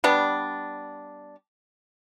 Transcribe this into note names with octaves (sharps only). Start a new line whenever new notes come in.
G3 B3 D4